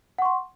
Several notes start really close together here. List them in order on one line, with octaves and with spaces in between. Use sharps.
F#5 C#6 C6